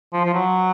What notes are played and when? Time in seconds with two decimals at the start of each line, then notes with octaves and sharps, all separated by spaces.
0.13 F3
0.25 F3
0.34 F#3